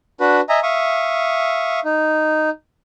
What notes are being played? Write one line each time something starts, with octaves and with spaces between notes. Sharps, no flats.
D4 F#4 B4
D#5 E5 G#5 A#5
E5 F5 C#6 D#6
D#4